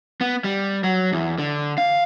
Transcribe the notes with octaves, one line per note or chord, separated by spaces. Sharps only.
B3
G3
F#3
E2
D3
F5